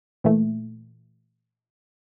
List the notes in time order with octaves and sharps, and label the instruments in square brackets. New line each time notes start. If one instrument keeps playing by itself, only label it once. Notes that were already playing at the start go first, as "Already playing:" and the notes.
[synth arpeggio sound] A#2 E3 A3